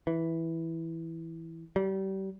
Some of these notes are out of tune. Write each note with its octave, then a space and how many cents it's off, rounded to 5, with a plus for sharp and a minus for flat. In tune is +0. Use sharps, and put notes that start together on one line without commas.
E3 -5
G3 -30